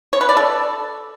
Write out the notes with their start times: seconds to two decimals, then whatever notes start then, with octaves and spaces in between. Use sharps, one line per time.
0.13 C#5
0.21 B4
0.29 D5
0.37 A4